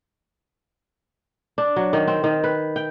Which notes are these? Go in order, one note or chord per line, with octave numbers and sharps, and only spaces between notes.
D4
F#3
D#3
C4
D#3
B4
G5